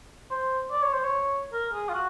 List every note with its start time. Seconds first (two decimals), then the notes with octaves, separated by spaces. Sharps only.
0.31 C5
0.71 D5
0.82 C#5
0.93 C5
1.04 C#5
1.53 A#4
1.73 G#4
1.89 F4
1.94 F#4